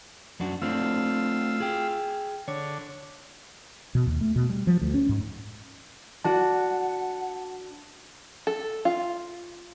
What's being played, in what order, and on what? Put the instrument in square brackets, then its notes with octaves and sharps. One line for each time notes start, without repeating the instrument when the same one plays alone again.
[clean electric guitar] F#2 D4 F#4
[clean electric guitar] A3 C4 D4 [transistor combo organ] F4 E6
[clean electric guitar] G#4 G5
[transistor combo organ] D3 [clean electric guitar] C#5
[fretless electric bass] B2
D#2
A3
B2
G3
F3
D2
C#4
G#2
[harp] D4 F#4 [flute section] F#5 [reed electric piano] A5
[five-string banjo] A4
F4